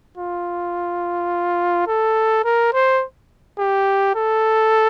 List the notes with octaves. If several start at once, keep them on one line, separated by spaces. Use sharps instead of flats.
F4
A4
A#4
C5
G4
A4